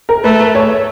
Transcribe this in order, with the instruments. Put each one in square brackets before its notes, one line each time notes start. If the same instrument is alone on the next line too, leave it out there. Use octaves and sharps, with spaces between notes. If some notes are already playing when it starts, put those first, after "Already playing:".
[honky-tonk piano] A#4
[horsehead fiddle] A3 [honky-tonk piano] B4
[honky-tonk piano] C#5